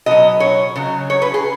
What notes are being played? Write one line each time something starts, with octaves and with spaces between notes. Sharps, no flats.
B2 F#3 D#5
C#5
C#3 F#3
C#5
B4
G#4